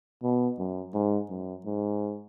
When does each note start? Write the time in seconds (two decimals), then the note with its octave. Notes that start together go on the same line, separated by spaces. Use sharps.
0.23 B2
0.58 F#2
0.94 G#2
1.30 F#2
1.66 G#2